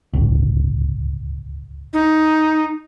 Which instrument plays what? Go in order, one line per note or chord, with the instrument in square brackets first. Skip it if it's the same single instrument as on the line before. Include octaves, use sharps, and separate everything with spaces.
[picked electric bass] D1 G1 C#2
[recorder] D#4